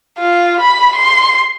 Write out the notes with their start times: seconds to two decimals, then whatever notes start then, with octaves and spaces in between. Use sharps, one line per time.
0.18 F4
0.60 B5
0.96 C6